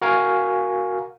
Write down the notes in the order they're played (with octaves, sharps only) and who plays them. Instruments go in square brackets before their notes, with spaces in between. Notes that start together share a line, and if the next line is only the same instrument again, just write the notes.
[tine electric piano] F#4 A#4 F5 G#5